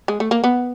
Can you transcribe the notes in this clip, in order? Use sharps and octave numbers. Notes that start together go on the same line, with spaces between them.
G#3
A3
A#3
B3